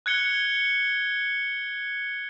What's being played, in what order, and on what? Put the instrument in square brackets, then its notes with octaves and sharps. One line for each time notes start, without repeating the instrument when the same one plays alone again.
[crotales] F#6 G#6 C#7 G7